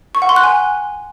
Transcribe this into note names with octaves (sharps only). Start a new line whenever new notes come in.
C#6
F#5
C6
F#6
G#5